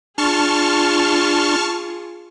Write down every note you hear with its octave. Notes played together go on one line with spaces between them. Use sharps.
D4 F4 G#4 A5 C6 C#6 F6